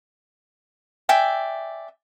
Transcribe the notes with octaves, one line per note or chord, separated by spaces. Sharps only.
D5 E5 G5 G#5